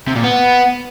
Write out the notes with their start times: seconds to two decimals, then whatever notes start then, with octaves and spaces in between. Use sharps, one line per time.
0.08 C3
0.15 A#2
0.23 B3